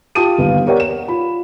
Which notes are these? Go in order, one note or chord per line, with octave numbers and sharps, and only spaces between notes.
F4 G4 G5 A5 D#6 D#7
G1 D#2 B4 F5
G4 A#4 C#5 D5 F#5
E7
F4 B5